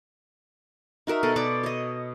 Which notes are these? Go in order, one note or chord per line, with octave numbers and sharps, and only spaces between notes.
D#4 F#4 A#4 E5
B2 A4 D#5
B2 B4 D5 D6
C#5 D#5